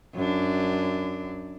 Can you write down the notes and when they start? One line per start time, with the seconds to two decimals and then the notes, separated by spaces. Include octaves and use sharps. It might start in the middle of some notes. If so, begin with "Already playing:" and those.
0.15 F#2 D4